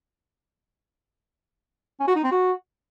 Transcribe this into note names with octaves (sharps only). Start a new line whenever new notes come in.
C#4
F#4
D#4
C4
F#4